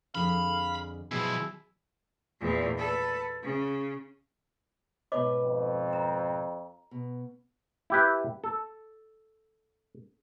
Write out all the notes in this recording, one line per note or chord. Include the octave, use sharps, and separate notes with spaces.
F2 D3 G#4 F5 B5
B2 F3 F#3 E4 G#4
E2 A#2
A4 B4
C#3
G#2 B2 B4 C#5 D#5 D6
F2
A#5
B2
E4 G4 B4
A4